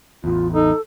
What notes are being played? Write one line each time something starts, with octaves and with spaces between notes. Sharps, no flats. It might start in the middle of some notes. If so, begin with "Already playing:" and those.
A1 E2 F4
D#4 A4